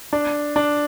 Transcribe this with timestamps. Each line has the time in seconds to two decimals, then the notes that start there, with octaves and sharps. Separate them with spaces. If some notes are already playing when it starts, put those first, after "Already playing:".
0.13 D4
0.56 D4